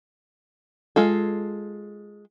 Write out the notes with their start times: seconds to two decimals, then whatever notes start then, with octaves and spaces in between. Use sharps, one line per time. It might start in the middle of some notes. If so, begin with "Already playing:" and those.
0.96 G#3 F4 A4